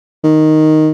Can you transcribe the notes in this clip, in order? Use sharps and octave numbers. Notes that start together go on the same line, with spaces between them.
D#3